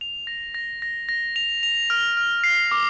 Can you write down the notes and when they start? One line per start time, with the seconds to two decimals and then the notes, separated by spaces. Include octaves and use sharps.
0.01 F7
0.27 A#6
0.54 A#6
0.82 A#6
1.09 A#6
1.36 F7
1.63 F7
1.90 F6
2.17 F6
2.44 C7
2.71 D6